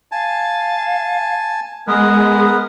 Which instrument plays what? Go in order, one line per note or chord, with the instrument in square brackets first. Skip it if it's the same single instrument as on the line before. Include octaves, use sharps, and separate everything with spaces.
[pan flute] F5 [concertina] G#5 A5
[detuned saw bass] G#3 [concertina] B3 A#4 B4 [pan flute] D#6